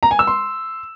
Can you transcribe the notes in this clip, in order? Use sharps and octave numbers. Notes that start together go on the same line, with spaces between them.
A#5
G#5
E6
C6